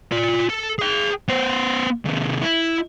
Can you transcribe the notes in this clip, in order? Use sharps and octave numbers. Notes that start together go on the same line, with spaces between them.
F4 D5
A4
G#4 G5
B3 C5
C3 D#3
E4